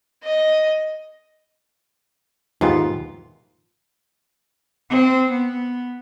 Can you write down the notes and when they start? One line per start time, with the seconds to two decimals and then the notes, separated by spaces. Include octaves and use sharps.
0.23 D#5
2.61 D#2 G#2 B3 F4
4.89 C4
5.31 B3